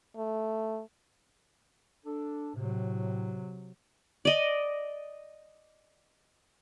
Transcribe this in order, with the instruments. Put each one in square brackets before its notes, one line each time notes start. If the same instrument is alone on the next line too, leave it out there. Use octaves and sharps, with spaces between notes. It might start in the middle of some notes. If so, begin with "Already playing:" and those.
[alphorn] A3
[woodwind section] D4 A4
[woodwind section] A2 [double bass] C3 F#3
[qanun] D5 D#5